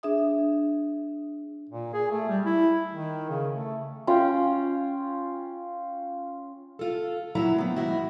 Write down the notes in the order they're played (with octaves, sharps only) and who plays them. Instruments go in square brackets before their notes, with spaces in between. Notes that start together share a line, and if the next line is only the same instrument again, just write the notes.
[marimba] D4 G#4 E5 D#6
[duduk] A#2
G#4
A3
G3
E4
D#3
C#3
A3
[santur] C#4 F4 G5
[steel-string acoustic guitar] F4 A4
A#2 D3 F#3 E4 A#5
A3 B3 C4
G#2 D#3 E4 F#4